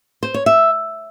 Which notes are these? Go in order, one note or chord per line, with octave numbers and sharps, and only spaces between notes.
C5
C#5
E5